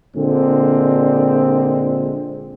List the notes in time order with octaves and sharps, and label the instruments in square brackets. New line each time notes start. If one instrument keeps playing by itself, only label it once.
[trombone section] A#2 D3 G#3 C4